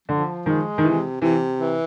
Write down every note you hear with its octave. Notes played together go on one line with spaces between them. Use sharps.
D3 F3
D#3 G#3
D#3
C3 E3
C3 E3
E3